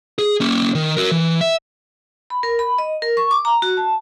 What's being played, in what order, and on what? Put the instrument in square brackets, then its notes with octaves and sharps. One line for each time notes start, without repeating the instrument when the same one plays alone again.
[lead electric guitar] G#4
A#3 C#4
D#3
F#4 A#4
E3
E5
[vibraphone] B5
A#4
B5
D#5
A#4
C#6
D6
A#5
F#4
A5